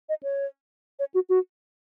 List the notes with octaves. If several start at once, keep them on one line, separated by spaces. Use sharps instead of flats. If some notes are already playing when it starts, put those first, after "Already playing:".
D#5
C#5
C#5
F#4
F#4